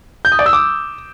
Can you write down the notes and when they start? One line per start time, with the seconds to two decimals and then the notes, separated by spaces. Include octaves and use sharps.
0.25 G6
0.32 D#6
0.39 D5
0.46 E6
0.53 D6